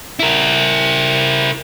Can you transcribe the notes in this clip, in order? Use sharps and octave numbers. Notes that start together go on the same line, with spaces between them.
E4 A#4